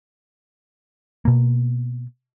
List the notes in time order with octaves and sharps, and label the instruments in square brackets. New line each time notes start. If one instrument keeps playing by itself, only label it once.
[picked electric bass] B2 A#3